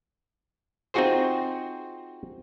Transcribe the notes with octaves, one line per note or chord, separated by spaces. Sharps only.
C4 D#4 F4 F#4 G#4 C5